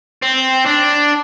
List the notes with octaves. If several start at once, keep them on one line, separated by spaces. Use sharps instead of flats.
C4
D4